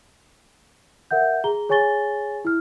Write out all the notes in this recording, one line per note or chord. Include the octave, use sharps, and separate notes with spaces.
A#4 E5 F#5 G6
G#4 A#5 G7
G#4 C#5 G#5 C#6 A6 G7
E4 F6